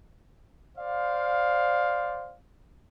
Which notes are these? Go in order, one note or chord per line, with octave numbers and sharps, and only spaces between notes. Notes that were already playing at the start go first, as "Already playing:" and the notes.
C5 D5 F5